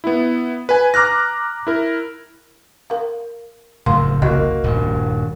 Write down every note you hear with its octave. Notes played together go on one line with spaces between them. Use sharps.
B3 E4
B4 G#5
A#5 D6 F6 F#6 A#6
E4 A#4
A#4 F5
F#1 F2 A2 A#4 F5 C6
C2 A#3 F#4 D#5
D#1 G2